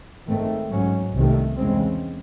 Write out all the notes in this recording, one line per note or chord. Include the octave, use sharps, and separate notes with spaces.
G#2 D#3 A3 C4
G#2 F#3 C#4
C2 C3 D#3 A3
E2 C#3 G#3 C4